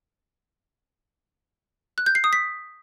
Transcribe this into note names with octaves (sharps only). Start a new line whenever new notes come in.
F#6
G6
C7
D#6
B6